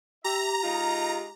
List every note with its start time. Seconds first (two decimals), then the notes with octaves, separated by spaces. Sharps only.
0.24 G4 E5 A#5
0.64 G#3 D#4 F4